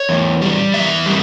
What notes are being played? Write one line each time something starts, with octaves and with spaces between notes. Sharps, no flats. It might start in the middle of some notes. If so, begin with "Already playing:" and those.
Already playing: C#5
E2
G3
E2 E5
G3